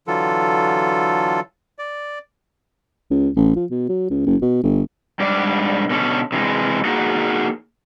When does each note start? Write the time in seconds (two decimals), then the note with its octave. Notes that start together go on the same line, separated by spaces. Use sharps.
0.07 D3 E3 F#3 F4 A4
1.79 D5
3.11 C#2
3.37 A1
3.56 F3
3.71 B2
3.89 F#3
4.11 C#2
4.27 F#1
4.42 B2
4.63 G1
5.20 G#2 G3 D4 D5
5.90 B2 D3 C#4 A4
6.32 C3 E3 F#3 G#3
6.85 A#3 D#4 F#4 G#4 F#5